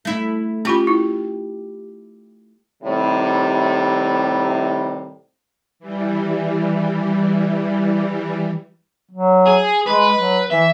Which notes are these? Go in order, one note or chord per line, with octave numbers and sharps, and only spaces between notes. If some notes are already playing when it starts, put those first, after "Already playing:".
A3 E4
C#4 F4 G4 B5
E4
A2 C3 D#3 G3
E3 G3
F#3
G#4
G#3 B4
F#3
E3 E5